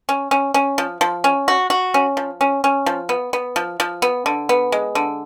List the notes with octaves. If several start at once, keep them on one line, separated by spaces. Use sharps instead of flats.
C#4
C#4
C#4
F3
F3
C#4
F#4
F#4
C#4
F3
C#4
C#4
F3
B3
B3
F3
F3
B3
D3
B3
G#3
D3